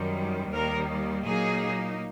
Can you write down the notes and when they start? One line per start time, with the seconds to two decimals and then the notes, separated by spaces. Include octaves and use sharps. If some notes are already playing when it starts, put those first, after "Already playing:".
Already playing: F#2 D#3 G3
0.52 D#2 D#3 G3 A#3 A#4
1.26 A#2 F#3 A#3 D#4 G#4